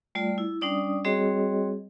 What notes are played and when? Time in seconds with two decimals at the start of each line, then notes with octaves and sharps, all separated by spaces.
0.15 G3 A3 F4 D5
0.38 E4
0.61 G3 C#4 D4 D5 D#6
1.05 G3 C4 F#4 G#4 C#5 D#5